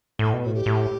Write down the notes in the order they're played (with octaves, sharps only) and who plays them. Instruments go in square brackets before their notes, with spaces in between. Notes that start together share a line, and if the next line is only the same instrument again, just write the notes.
[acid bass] A2 [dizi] A4
[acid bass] B2
[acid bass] A2 [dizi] F#4
[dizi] G4
[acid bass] A2